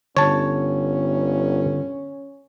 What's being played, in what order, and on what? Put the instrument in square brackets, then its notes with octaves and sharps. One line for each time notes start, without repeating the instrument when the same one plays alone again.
[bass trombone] G1 [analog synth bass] D3 [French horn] C#4 [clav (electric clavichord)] C#5 A5